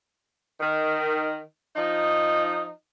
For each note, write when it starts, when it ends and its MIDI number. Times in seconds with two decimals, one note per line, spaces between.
0.60 1.40 51
1.76 2.70 53
1.76 2.70 63